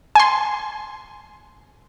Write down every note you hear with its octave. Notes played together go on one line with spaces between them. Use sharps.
G#5 C6